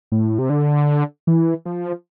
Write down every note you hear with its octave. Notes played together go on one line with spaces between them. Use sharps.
A2
C3
D3
E3
F3